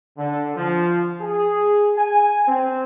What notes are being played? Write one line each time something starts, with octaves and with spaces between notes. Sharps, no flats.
D3
F3
G#4
G#5
C4